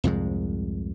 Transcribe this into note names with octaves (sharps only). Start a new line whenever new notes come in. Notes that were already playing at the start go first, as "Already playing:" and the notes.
C2 F2 G#2 G#3